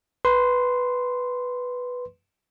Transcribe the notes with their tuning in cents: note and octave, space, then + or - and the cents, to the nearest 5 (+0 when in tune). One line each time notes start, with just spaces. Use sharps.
B4 +0 C6 -5